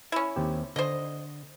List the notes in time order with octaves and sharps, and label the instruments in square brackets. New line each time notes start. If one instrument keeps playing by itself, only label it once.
[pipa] C#4 E4
[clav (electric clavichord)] D#2 C4 G4
[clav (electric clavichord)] D3 [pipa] C5 D#5